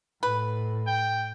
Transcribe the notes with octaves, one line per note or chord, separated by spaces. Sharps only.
A2 B4
G5